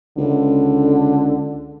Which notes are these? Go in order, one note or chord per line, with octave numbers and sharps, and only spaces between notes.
C#2 D3